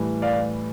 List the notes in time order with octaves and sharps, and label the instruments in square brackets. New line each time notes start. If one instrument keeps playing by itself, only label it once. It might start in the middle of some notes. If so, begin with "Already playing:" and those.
Already playing: [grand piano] A2 E3 G3
D5 F5